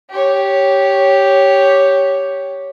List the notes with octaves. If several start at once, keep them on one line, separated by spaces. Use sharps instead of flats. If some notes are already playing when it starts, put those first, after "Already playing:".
G4 C#5